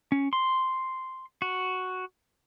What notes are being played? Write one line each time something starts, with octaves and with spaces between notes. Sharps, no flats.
C#4
C6
F#4